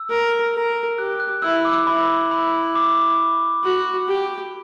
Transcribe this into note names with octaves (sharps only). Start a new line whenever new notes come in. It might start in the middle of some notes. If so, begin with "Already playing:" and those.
Already playing: E6
A#4
A#4
G4 F#6
F#6
E4 E6
D6
E4 B5
B5
D6
F#4
G4